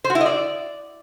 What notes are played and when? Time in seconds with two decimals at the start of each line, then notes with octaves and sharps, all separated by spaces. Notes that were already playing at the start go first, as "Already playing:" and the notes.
0.04 C5
0.10 F#4
0.15 E4
0.20 D#5
0.26 D5